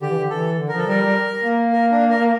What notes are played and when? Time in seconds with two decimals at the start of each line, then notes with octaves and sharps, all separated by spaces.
0.01 D3 G4
0.10 E3
0.18 D3
0.30 E3 A4
0.59 D3
0.68 F3 A#4
0.78 A4
0.87 G3 A#4
1.02 G3
1.44 A#3
1.73 A#4
1.91 D4
2.10 A#4